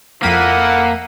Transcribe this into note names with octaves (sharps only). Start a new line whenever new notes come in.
F2 A#3 E4 A4 F#5 B6 D#7